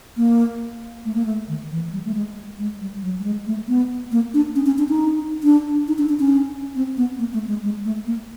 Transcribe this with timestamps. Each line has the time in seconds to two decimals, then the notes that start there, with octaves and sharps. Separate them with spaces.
0.17 A#3
1.05 A3
1.14 A#3
1.25 A3
1.48 D#3
1.71 E3
1.93 G3
2.05 A3
2.15 G#3
2.59 G#3
2.81 G3
3.02 F#3
3.19 G3
3.24 G#3
3.47 A3
3.68 B3
4.12 A#3
4.34 D4
4.55 C#4
4.66 C#4
4.78 D4
4.89 D#4
5.43 D4
5.88 D#4
5.98 D4
6.09 D4
6.20 C#4
6.76 C4
6.97 B3
7.19 A#3
7.33 A3
7.48 G#3
7.63 G#3
7.85 A3
8.06 A#3